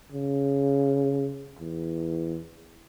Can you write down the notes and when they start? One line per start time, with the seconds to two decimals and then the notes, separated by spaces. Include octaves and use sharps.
0.12 C#3
1.59 E2